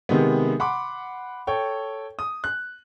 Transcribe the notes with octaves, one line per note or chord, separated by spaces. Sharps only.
C3 D#3 G#3 B3
F#5 B5 C6 D6
A4 C#5 G5
D#6
F#6